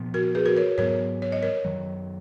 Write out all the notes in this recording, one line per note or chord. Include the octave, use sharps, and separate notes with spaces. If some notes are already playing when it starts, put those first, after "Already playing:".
Already playing: A#2 F3 B3
F#4 A#4
G#4 B4
F#4 A#4
A#4 C#5
G#2 F#3 B3 A#4 C#5
C#5
D#5
A#4 C#5
F#2 D#3 F#3